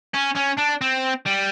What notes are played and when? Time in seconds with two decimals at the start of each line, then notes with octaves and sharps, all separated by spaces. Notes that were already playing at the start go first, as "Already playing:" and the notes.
0.14 C#4
0.36 C#4
0.58 D4
0.81 C4
1.26 G3